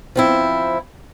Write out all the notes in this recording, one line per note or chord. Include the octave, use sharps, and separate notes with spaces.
F3 C4 E4